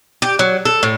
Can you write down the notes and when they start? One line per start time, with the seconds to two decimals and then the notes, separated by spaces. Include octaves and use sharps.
0.22 G4
0.39 F#3
0.65 A4
0.83 A2